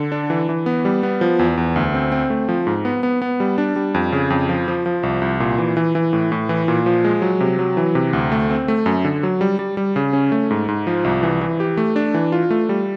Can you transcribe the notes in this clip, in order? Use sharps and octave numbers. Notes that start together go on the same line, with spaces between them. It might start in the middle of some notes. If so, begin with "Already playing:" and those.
Already playing: D3
D4
E3
E3
B3
G3
B3
F3
E2
E2
D2
C4
C4
A3
F3
G#2
B3
B3
B3
G3
D4
G3
F2
C#3
F2
F3
F3
F3
C2
C2
A#2
E3
E3
E3
A2
A2
E3
A#2
F3
G#3
F#3
C3
F#3
E3
C3
D2
A3
C4
A3
F#2
D3
F#3
G3
G3
G3
C#3
C#4
A3
G#2
G#2
F3
C2
E3
E3
G4
A3
D4
E3
F4
A3
G3